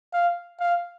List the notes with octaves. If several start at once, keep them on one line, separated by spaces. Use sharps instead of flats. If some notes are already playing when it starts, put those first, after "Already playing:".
F5
F5